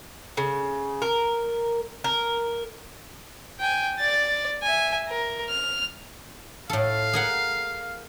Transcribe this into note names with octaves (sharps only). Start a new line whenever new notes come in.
C#3
A#4
A#4
G5 G#5
D5 A6
E5 G#5
A#4
F6
A2 A4 F5
G#4 A#4 F#5